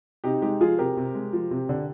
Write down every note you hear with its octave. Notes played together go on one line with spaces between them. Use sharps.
C3 D#4 G4
G#3 D#4 G4
F3 F4 G#4
C3 G4 A#4
C3
G#3
F3
C3
D3